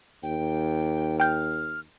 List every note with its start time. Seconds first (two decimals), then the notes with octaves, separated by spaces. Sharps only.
0.23 D#2 G5
1.20 G5 F6 G6